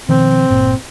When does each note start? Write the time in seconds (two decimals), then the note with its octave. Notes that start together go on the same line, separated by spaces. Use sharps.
0.09 B2 D#3 F3 C4
0.50 G1 A#2